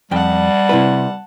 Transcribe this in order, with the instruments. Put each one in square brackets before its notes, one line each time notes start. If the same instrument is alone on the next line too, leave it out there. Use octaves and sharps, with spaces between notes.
[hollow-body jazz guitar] F2 G5 [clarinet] G3 [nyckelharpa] F#5 A5
[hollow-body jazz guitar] C3 E4 B4